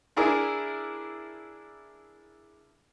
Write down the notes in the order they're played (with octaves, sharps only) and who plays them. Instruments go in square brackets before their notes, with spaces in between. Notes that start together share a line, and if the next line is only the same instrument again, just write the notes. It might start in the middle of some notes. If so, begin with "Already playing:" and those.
[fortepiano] D4 E4 G#4 A#4